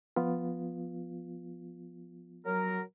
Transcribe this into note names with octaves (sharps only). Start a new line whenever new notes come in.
F3 B3 F4
F#3 A#4